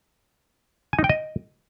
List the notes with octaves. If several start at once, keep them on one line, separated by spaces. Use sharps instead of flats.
G#5
D#4
G5
D#5